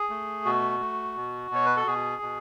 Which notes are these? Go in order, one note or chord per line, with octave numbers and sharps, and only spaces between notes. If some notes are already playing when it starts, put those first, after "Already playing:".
Already playing: G#4
A3
B2 F#4
A3
B2
B2 C#5
B4
A4
B2 G#4
B2